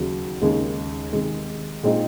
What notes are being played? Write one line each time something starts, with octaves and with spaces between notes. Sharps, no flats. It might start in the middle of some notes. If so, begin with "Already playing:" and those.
Already playing: D#2 C#3 F#3
D#2 C#3 G#3
C3 D#3 G#3
A#2 G#3 C4 D#4